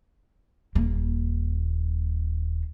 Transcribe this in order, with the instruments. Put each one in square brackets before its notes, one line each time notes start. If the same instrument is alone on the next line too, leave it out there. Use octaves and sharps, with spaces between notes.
[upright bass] D#1 A#3